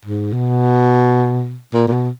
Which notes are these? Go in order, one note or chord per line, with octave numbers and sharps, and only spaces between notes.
G#2
B2
A#2
A#2
B2